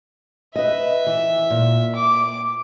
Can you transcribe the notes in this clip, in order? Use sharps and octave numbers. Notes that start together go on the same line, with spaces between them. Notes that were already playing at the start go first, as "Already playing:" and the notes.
B4 D#5 E5
E3
A#2
D6